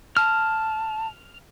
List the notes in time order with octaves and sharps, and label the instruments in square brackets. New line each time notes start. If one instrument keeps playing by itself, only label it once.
[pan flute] A5 [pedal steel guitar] F6